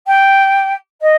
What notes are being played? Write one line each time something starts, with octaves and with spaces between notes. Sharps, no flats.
G5
D#5